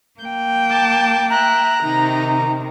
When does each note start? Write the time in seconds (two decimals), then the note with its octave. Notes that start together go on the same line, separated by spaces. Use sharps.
0.21 A#3 G5
0.70 A5 D6
1.30 E5 A#5 F#6
1.82 C3 D#3 D#4